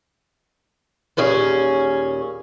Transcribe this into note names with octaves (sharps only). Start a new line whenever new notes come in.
D#2 A#2 C#4 G#4 G#5